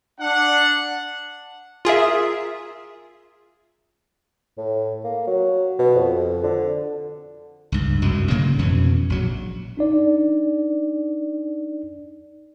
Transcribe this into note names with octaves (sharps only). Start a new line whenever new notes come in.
D4 F#5
F4 G#4 A#4 E5
A2
A#3
F#3
B2
F2
D3
C#2 G2
C2 F#2 G#3
A2 C#3 F#3 A#3
F2 B2 E3 C#4
A#1 F#3
D4 D#4 D5